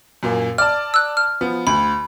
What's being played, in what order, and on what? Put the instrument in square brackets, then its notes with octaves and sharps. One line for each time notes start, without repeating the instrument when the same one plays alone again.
[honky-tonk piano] F#2 A#2 A#3
[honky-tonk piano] D5 A5 [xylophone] F6
[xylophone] E6 F#6
F6
[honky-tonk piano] F3 B3
[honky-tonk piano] D2 [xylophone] B5